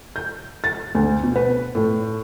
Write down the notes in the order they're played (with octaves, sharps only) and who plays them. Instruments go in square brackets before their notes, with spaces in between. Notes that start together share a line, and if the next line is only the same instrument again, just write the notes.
[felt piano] G6
A6
D2
B2
B4
A2